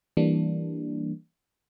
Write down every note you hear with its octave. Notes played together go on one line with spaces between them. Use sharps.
E3 G3 A#3 D4